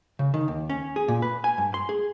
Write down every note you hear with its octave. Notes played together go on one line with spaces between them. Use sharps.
C#3
D#3
D#2
C#4
G#4
A#2
B4
G#5
G2
C6
G#4